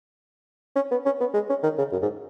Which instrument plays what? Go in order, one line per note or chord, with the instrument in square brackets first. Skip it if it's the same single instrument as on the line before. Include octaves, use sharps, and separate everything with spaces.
[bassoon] C#4
B3
C#4
B3
G#3
C#4
D#3
C#3
F#2
G#2